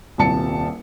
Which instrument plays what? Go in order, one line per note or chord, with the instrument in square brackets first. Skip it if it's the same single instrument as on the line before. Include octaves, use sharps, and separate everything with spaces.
[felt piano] D#1 C2 A5 C#7